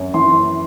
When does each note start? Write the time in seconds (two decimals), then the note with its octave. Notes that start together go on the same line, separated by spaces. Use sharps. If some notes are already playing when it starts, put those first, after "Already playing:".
Already playing: F#2
0.14 E3 C6